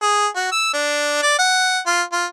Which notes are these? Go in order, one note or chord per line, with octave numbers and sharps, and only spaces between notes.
G#4
F#4
E6
D4
D5
F#5
F4
F4